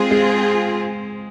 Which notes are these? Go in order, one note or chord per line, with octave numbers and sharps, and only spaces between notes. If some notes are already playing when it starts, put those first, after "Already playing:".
Already playing: G#3 C4 F4 G#4
G#3